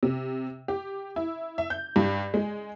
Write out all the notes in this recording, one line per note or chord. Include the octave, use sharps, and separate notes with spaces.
C3
G4
E4
E5
G6
G2
G#3